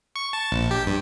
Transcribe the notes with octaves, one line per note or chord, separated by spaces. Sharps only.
C#6
A5
A#1
G4
G2